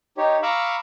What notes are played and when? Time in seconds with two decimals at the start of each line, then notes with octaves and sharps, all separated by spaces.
0.17 D#4 G4 C#5
0.43 F5 A#5 B5 C#6 D6 E6